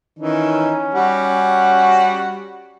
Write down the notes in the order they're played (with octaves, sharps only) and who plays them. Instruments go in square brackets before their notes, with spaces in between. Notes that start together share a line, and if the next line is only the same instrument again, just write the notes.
[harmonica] D#3 E3 D#4 [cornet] C#4
[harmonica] G3 F#4 F#5